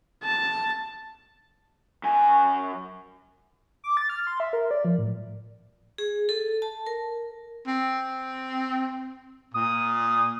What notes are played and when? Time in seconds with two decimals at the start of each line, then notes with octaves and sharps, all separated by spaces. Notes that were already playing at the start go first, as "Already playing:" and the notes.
0.24 A5
2.03 F#2 G#5
3.84 D6
3.97 A6
4.10 F6
4.27 C6
4.40 E5
4.53 A#4
4.71 D5
4.85 F3
4.98 A2
5.98 G#4
6.29 A4
6.62 A5
6.87 A#4
7.67 C4
9.54 A#2 D#6